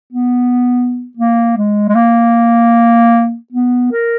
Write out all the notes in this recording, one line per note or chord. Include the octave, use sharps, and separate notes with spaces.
B3
A#3
G#3
G#3
A#3
B3
A#4